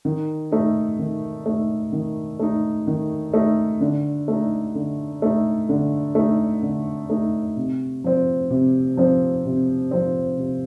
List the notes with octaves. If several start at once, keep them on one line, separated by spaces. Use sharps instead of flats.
D#3
A3 D#4
D#3
A3 D#4
D#3
A3 D#4
D#3
A3 D#4
D3
A3 D#4
D3
A3 D#4
D3
A3 D#4
D3
A3 D#4
C3
F3 C4
C3
F3 C4
C3
F3 C4
C3